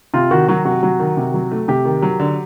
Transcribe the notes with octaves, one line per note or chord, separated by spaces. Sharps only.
C3 F4
D#3 F#4
F#3 F#4
C3 F#4
F#3
D#3
C3
F#3
A3
C3 G4
D#3
F#3
D3